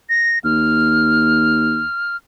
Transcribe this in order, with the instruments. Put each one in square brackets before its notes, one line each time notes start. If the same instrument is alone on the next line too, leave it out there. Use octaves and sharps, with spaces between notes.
[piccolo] A#6
[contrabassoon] D#2 [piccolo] F6